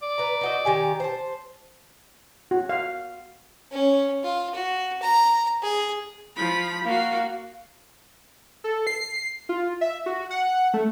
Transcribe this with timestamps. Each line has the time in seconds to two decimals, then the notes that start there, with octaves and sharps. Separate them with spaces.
0.02 D5
0.18 B4 A#5
0.41 D#4 F#4 D#5
0.65 D#3 G4 G#5
1.00 C5 A5
2.51 F#4
2.69 F5
3.72 C#4
4.24 F4
4.55 F#4
5.02 A#5
5.63 G#4
6.37 F3 B5
6.84 A#3 F#4 F5
8.64 A4
8.87 C7
9.49 F4
9.81 E5
10.06 F#4
10.31 F#5
10.74 A3